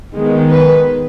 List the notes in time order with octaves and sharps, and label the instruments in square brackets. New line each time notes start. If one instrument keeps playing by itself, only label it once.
[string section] D#3 G#3 B3
B4